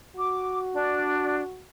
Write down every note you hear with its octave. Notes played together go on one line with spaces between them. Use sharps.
F#4 D6
D4